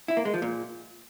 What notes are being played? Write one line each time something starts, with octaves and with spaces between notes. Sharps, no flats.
E4
A#3
G#3
F3
A#2